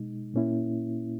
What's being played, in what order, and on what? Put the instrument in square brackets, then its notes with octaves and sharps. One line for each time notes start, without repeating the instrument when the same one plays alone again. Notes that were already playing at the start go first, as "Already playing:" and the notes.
Already playing: [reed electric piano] B2 G#3 D#4
A#2 A#3 C#4 E4